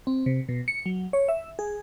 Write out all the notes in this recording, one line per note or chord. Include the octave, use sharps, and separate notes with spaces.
C4
C3
B2
C#7
F#3
C#5
E5
G#4